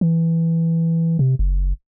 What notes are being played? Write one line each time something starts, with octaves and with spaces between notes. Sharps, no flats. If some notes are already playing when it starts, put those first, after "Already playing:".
E3
C3
F#1